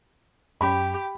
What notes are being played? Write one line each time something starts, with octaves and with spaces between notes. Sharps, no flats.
F#2 C#4 G4 B5